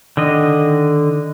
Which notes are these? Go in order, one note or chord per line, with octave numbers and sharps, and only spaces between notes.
D3 D#3 D#5